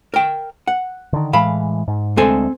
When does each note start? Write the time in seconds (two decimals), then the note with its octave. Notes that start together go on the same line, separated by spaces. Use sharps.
0.14 A#4 G5
0.67 F#5
1.13 D3 D#3
1.33 A2 E3 G#3 F5 B5
1.88 G#2
2.17 D2 G#3 C4 A4 G#5